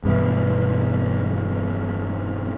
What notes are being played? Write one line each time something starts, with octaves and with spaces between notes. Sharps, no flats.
E1 G2 B2 E3